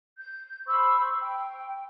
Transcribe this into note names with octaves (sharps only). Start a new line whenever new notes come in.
G6
C5 B5 C#6 E6
G5